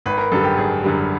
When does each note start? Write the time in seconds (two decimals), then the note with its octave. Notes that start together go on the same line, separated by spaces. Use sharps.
0.06 G#1 B4
0.18 A#4
0.32 F#2 D3 G3 A4
0.44 G4
0.57 G#1 G#4
0.84 F#2 D3 G3